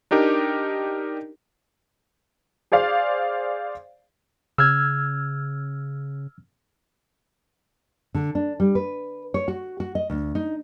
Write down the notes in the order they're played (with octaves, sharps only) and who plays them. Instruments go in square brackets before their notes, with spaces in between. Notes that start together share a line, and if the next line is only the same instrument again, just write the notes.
[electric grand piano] D4 D#4 G4 A#4
[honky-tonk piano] G#4 C5 D5 F5
[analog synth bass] C#3 [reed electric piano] E6 F6 G#6
[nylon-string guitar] D3
D4
G3
B4
C#5
F#4
F#4
D#5
D2
D#4